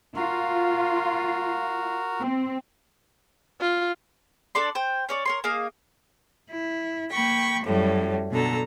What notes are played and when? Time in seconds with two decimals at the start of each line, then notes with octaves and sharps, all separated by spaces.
0.16 F4 F#4 A#4
2.20 C4
3.61 F4
4.55 D4 A4 D5 C6
4.75 C5 G5
5.09 C#4 C#5 D5
5.25 A#4 C#5 C6
5.44 A#3 G#4 D#5 F5
6.51 E4
7.11 A#3 G5 B5 C#6
7.65 F#2 A2 F#3 G3
8.31 B2 D3 A4 A#5